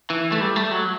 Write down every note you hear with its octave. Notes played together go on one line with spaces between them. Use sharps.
E3
A3
G3
A3
F#3